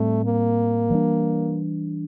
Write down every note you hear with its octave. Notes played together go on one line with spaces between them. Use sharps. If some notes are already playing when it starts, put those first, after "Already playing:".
Already playing: A2 G3 A3 C4
A#3
E3 G3 D4